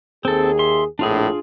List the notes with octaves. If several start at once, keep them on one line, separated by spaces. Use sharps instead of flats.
D#2 C4 G#4 A4
E5 C6
A#1 F2 A2 D4 F4 G#4